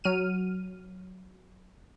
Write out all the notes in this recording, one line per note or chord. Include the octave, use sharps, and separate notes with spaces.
F#3 F6 D#7